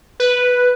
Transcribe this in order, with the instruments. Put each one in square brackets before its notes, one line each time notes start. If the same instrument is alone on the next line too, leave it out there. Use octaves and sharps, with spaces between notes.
[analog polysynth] B4